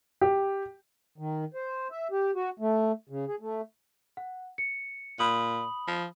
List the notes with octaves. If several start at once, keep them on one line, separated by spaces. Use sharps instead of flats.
G4
D#3
C5
E5
G4
F#4
A3
C#3
G#4
A3
F#5
C#7
A#2 B5 D#6 F#7
F3